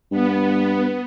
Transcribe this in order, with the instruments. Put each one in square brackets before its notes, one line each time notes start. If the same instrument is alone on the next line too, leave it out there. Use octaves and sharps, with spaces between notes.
[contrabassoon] G2 [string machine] B3